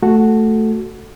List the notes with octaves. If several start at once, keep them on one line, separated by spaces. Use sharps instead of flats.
A3 F#4 A4